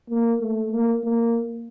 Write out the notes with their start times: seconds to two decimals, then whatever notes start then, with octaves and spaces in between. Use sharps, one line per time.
0.10 A#3
0.41 A3
0.72 A#3
1.04 A#3